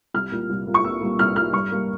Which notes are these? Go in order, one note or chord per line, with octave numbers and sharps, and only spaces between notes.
C2 F6
A#2 G3 A#3
C2
A#2 G3 A#3
C#6
C2 E6
A#2 G3 A#3
C2 F6
A#2 G3 A#3 F6
G2 C#6
G3 A#3